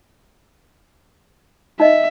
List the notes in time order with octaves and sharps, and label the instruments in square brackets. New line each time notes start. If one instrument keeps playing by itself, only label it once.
[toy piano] D#4 D#5 [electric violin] E5